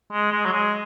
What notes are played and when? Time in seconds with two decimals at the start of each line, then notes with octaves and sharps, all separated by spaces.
0.12 G#3
0.32 G#3
0.46 F#3
0.53 G#3